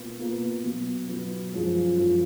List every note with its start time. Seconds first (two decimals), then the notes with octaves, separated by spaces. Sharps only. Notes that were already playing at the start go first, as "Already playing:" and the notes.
Already playing: B2 A#3 F4 B4
0.19 B2 A#3 F4 B4
0.63 B2 F#3 B3
1.07 B2 F#3 B3
1.52 F#2 F3 G#3
1.96 F#2 F3 G#3